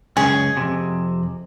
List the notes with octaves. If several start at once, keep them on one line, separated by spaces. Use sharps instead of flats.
C#2 F#2 C#4 G#4
F2 C3